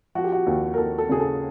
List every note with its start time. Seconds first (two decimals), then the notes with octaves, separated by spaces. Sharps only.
0.15 F3 F#4
0.24 G4
0.32 F#4
0.46 D#2
0.74 A#4
0.77 D#2 A4
0.98 A4
1.09 C#3 G#4
1.20 A4